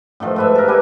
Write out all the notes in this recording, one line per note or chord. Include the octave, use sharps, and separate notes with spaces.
A2 D#3 F3 A3
G#2 B4 E5
A4 A#4
G3 G4 B4 G#5